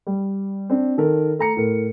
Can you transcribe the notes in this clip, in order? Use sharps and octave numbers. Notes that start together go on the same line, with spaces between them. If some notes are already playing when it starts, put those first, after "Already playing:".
G3
C4 D4
D#3 A4 A#4
A3 A#5 C#7
A2 A#4